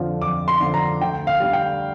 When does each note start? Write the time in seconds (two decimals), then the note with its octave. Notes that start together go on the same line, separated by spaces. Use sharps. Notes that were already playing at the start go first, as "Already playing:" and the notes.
Already playing: F2 D3 F3
0.21 F2 D6
0.48 C6
0.61 D3 F3
0.74 A#5
1.00 D2 G5
1.27 F5
1.40 D3 G3
1.53 G5